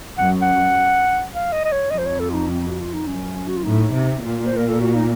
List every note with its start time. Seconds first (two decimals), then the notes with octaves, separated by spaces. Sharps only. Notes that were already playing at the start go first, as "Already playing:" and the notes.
0.18 F#2 F#5
0.42 F#5
1.34 F5
1.52 D#5
1.64 D#5
1.72 C#5
1.91 F2 D#5
1.98 C5
2.06 C#5
2.19 A4
2.30 F4
2.34 D#4
2.49 C4
2.67 F#4
2.80 F4
2.94 D#4
3.07 F#2 C#4
3.48 F#4
3.57 F4
3.64 A2 D#4
3.93 C3
4.22 A#2 F4
4.46 C5
4.56 A#4
4.68 A4
4.80 F#4
4.95 D#4